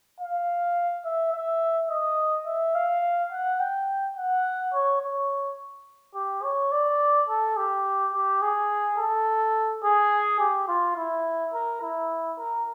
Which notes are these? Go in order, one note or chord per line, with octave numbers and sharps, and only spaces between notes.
F5
E5
E5
D#5
E5
F5
F#5
G5
F#5
C#5
C#5
G4
C#5
D5
A4
G4
G4
G#4
A4
G#4
G4
F4
E4
A#4
E4
A#4